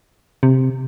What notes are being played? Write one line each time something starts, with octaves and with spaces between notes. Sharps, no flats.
C3